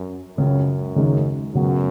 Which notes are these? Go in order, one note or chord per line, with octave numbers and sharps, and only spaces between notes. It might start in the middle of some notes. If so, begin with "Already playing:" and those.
Already playing: F#2
C#2 F#2 C#3 G#3
D#2 C#3 G#3 D#4
C#2 F#2 C#3 F#3 B3 F#4